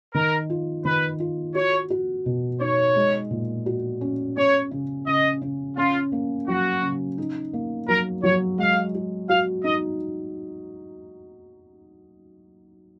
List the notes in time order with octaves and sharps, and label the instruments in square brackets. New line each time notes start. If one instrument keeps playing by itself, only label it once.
[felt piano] D#3 [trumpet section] A#4
[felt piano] F4
[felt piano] D#3 [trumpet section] B4
[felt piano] F4
[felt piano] F#4 [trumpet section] C#5
[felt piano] F#4
B2
[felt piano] D#4 [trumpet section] C#5
[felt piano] G#3
A#2
F#4
C#4
[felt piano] C#4 [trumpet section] C#5
[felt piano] C#3
[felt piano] C#3 [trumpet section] D#5
[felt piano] C#3
[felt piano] C#4 [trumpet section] F4
[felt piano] A#3
[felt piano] F#3 [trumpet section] F#4
[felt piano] C#3
D#4
A#3
[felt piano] F#3 [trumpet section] A#4
[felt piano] F#3 [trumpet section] C#5
[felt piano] G#3 [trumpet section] F5
[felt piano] F#4
[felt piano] F#4 [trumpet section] F5
[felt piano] D#4 [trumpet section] D#5